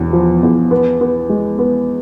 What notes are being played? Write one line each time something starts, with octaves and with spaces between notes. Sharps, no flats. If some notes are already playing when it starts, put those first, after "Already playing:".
Already playing: E1 E2
F3
E2
B3
B3
G#3
B3